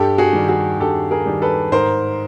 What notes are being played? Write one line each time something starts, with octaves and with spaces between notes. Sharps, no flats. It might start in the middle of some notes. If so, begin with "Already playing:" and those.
Already playing: G2 G4 A4
F#4 G#4
D#3 G3
F#4 G#4
G2 G4 A4
G#4 A#4
D#3 G3
A4 B4
G#2 A#4 C5